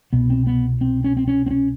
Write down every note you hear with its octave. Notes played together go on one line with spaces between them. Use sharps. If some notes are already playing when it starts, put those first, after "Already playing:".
C2 B2 B3
C4
B3
C4
C#4
C4
C#4
C4
C#4